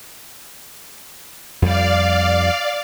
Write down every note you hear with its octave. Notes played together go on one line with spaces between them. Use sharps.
F2 G3 D5 F5